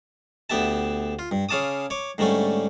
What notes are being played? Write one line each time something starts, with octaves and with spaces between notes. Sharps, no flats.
D2 B3 G4 E5 A5
F4
G2
C#3 C#4 F5 A5 D6 D#6
C#5 D6
G#2 D3 G3 A3 C#4